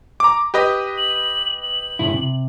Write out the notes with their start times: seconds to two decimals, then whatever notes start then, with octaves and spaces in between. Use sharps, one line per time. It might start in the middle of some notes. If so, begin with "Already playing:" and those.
0.20 A#5 D6
0.54 G4 B4 D#5
0.98 F#7
1.62 F#7
1.99 C#2 G2 E4
2.14 C3